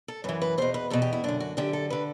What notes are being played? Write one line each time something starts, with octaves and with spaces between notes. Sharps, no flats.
A4
F#2 E3 B4
B4
E2 B2 C5
B4
E2 B2 A4
G4
E4
F#2 D3 D4
F#4
F#2 D3 G4
A4
D3 B4